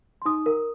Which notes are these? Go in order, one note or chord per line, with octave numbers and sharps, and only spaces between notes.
C6
D#4 D#6
A#4